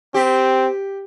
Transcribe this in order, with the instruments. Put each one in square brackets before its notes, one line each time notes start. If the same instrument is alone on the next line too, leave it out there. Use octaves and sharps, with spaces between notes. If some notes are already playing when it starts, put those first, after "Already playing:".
[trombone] C4 [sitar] G4